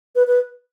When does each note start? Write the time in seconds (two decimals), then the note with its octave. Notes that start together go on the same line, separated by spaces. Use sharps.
0.15 B4
0.27 B4